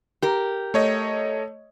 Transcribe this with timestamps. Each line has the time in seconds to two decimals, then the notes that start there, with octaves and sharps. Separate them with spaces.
0.22 G4 A#4
0.74 A3 C#5 D#5